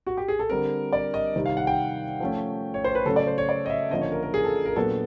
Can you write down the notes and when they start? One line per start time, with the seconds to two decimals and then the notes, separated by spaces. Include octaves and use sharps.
0.07 F#4
0.17 G4
0.28 G#4
0.39 A4
0.50 D3 G3 C4 A#4
0.93 D5
1.14 D#5
1.36 C3 D#3 G3
1.46 F5
1.57 F#5
1.67 G5
2.20 F3 A3 C#4
2.74 C#5
2.84 C5
2.95 B4
3.05 C#3 F#3 A3 C#4 A4
3.16 D5
3.27 C5
3.38 C#5
3.49 D5
3.66 D#5
3.70 E5
3.91 D3 F3 A#3 C#4 D#5
4.01 C#5
4.12 A#4
4.23 A#4
4.34 G#4
4.45 A4
4.65 A#4
4.76 A#2 F#3 B3 D4 A4